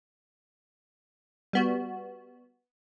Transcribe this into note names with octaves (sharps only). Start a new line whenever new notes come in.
G3 B3 F#4